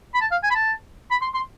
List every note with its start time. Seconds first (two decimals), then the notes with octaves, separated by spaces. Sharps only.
0.14 B5
0.21 A5
0.31 F5
0.43 G#5
0.50 B5
0.55 A5
1.11 B5
1.21 C6
1.34 C6